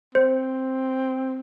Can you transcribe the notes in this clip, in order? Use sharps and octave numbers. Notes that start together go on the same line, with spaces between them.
C4 C5